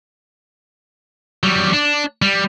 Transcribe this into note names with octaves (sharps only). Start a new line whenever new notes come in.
F#3 G3
D4
G3